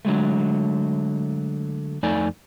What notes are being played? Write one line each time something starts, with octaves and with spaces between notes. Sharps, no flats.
D3 F#3 G#3 A3
F2 A3 D#4 D5 G#5